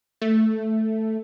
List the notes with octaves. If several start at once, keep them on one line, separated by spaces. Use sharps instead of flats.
A3